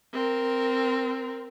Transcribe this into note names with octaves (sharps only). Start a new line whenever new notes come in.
C4 A#4